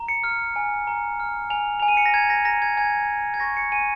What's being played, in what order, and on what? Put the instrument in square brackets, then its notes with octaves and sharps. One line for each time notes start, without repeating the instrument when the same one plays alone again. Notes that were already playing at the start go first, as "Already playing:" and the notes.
Already playing: [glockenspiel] A#5
C#7
F6
G#5
A#5
F6
G#5 F7
G#5 F7
D#7
C#7
A#6
A#5 G#6
A#6
A#5 A#6
G#6
G#5 G#6
G#5
G#6
C#6 A#6
C#7
G#5 D#7